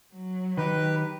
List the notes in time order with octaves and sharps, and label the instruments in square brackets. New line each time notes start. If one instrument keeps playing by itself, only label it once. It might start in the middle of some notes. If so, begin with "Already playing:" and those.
[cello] F#3
[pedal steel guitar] D#3 D#4 G4 [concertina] B4